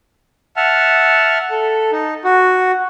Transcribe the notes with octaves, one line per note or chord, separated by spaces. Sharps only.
E5 F#5 A5 F6
A4
D#4
F#4